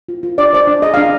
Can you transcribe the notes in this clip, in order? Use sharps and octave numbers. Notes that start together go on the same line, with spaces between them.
F4
F4
D4 D5
C5 D5
D4
G#4 D#5
D4 F5